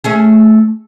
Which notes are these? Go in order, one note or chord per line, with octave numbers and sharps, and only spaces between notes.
A3 C#4 G#4